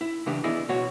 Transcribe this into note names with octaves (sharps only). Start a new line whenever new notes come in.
E4
C#3 E3 D4 G4
B3 E4 G#4 D5 D#5
B2 F#4 C#5